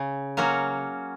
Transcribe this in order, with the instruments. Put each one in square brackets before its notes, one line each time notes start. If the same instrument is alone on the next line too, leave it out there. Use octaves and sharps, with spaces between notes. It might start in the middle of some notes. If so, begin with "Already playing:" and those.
Already playing: [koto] C#3
F#3 A#3 C#4 F#4